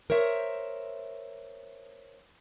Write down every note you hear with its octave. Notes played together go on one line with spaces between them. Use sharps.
A#4 C5 C#5 E5